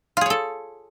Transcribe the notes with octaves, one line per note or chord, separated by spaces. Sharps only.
F4 G#4 A4 C#5